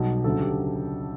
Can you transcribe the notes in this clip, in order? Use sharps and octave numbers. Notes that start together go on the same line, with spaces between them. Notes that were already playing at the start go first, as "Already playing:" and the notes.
Already playing: B1 B2 G3 G4
D2 C#3 F#3 A4
G4